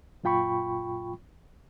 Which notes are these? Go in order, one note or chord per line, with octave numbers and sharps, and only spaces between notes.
F#2 A#2 F4 G5 B5 C#6